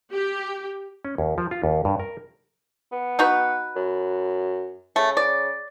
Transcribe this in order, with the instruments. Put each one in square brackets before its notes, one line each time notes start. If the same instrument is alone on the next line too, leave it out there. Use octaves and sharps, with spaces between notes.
[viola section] G4
[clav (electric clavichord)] C#4
D#2
F3
F4
D#2
G2
A#4
[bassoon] B3
[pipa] D#4 F#4 B4
[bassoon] F#2
[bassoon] C#3 [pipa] A3
[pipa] D5